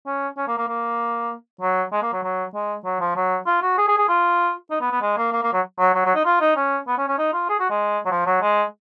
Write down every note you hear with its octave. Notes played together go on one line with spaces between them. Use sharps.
C#4
C#4
A#3
A#3
A#3
F#3
G#3
A#3
F#3
F#3
G#3
F#3
F3
F#3
F4
F#4
G#4
G#4
G#4
F4
D#4
B3
B3
G#3
A#3
A#3
A#3
F#3
F#3
F#3
F#3
D#4
F4
D#4
C#4
B3
C#4
C#4
D#4
F4
G#4
F#4
G#3
F#3
F3
F#3
G#3